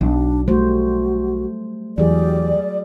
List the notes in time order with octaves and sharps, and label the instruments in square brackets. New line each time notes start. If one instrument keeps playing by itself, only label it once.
[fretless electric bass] B1 [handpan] F#3 [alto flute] D4
[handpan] G3 A3 C5 [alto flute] F#4
[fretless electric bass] E2 [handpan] F#3 G#4 [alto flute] G4 [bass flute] D5